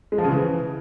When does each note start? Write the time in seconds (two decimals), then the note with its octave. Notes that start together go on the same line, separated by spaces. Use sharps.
0.12 G#3
0.18 F3
0.24 C#3
0.30 E3